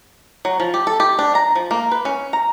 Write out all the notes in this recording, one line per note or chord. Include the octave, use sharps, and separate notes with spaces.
F#3
F3
G4
A4
G4
D4
A#5
F3
A#3
B4
C#4
A#5